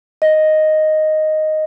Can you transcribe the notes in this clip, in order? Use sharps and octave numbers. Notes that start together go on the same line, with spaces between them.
D#5